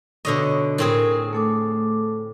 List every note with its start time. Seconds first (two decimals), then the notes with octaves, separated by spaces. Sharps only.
0.25 B2 D3 C#5 D#5 C#6
0.78 A2 C4 G#4 A#4
1.33 A3 A4 D6